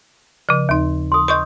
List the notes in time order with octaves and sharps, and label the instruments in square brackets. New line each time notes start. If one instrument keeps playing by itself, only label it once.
[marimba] C#3 F3
D#2 D#4
[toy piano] C6 D#6
[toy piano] B4 D#5 [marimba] C6 C#6 G6